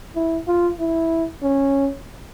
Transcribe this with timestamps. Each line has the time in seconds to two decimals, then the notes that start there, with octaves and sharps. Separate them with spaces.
0.15 E4
0.47 F4
0.79 E4
1.43 C#4